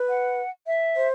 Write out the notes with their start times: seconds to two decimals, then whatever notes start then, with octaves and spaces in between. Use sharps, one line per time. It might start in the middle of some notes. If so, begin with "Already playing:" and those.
Already playing: B4
0.09 F#5
0.67 E5
0.96 C5